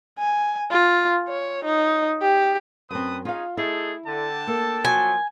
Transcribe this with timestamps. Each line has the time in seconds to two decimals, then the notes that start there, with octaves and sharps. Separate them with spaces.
0.19 G#5
0.71 F4
1.28 C#5
1.65 D#4
2.21 G4
2.91 F#2 C4 B4 A5 D#6
3.25 C#4 D#4 F4 G#4 F5
3.57 A3 D#4 E4 G#4 A4
4.06 D3 D4 G5 A5
4.47 A#3 A4
4.85 F3 F#3 G#5